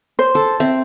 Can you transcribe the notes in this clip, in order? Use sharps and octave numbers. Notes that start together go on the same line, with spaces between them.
C5
A4
C4 E5